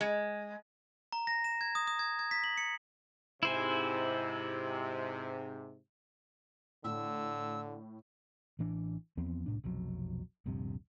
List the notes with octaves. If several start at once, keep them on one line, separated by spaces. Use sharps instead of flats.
G#3
A#5
A#6
E7
G#6
D#6
D#6
G#6
G#6
B6
F#7
C#7
G#2 C3 E4 C5 G#5
A2 D3 E6
A1 A2 E3 D4
E2 F3 B3 C4
C2 A2 D4
F1 B1 F2 F#3
D#1 A#1 G2 C3